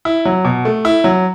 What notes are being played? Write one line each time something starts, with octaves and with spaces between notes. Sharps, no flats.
E4
F#3
B2
A3
E4
F#3